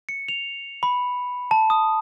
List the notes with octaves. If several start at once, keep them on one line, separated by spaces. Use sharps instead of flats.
C#7
F7
B5
A5
D#6